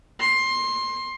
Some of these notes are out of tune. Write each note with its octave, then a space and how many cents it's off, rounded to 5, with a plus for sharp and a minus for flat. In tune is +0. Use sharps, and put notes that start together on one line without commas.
C6 +20